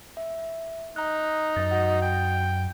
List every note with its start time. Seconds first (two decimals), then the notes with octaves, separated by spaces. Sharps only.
0.17 E5
0.96 D#4 A#5 F#6
1.56 F#2 D#5 A6
1.71 F#4 F#5
2.02 G5